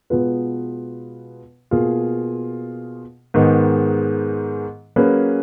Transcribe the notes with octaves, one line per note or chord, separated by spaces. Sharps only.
B2 G#3 B3 F4 B4
B2 A#3 F4 G#4
G#2 D#3 G#3 B3 D#4
F#3 A#3 C#4 G#4 B4